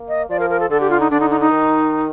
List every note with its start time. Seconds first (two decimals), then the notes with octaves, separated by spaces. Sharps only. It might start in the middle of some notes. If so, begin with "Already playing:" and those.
Already playing: A#3
0.08 D#5
0.29 F3 D5
0.39 A#4
0.50 A#4
0.60 A4
0.70 D3 A4
0.80 G4
0.90 F4
1.00 D#4
1.11 D3 D4
1.20 D#4
1.30 D#4
1.40 D#4
1.51 D#3